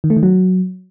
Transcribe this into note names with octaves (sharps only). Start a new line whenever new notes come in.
D#3
A3
D#3
F#3